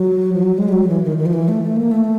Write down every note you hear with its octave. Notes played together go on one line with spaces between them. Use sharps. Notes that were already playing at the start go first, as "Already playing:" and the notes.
Already playing: F#3
F3
F#3
G#3
G3
F#3
E3
D#3
D#3
F3
E3
A3
A3
A#3
A3